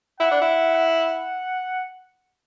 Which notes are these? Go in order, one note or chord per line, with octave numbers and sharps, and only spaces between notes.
E4 F#5
D4
E4
F#5